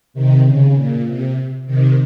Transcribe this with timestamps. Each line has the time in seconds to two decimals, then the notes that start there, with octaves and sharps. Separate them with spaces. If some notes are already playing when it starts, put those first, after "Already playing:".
0.14 C3 D#3
0.44 C#3
0.75 A#2
1.05 C3
1.66 C3 D#3